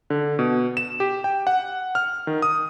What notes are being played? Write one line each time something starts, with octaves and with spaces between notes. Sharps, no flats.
D3
B2
E7
G4
G5
F#5
F6
D#3
D#6